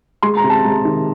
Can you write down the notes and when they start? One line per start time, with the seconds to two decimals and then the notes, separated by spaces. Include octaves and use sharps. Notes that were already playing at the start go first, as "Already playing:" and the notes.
0.22 G#3 C6
0.37 A#5
0.44 C3
0.50 A5
0.65 G#3
0.85 D#3